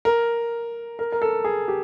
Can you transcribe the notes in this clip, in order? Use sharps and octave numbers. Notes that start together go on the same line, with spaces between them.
A#4
A#4
A#4
A4
G#4
G4